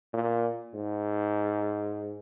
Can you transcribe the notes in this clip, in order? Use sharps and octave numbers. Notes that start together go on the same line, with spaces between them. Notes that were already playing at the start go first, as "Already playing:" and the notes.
A#2
G#2